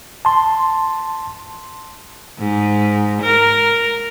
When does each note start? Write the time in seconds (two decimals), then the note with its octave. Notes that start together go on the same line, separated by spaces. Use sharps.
0.25 A5 C6
2.38 G#2
3.22 A#4